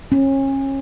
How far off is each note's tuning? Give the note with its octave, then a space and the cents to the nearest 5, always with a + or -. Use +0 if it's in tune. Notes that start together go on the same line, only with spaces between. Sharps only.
C#4 -30